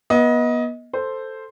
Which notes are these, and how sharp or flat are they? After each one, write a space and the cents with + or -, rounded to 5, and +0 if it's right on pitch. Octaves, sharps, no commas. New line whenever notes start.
B3 -30 D#5 +20
A4 +5 C5 +0